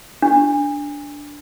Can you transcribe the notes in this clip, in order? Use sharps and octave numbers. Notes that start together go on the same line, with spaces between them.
D4